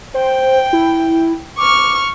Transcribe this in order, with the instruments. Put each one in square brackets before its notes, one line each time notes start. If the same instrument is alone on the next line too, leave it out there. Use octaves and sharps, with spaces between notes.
[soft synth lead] C5 [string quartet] G5
[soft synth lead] E4
[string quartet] C#6 F6 [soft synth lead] D6